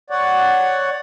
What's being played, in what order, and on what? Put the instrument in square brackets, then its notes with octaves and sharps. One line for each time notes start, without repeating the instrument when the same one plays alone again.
[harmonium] C#5 D5 F#5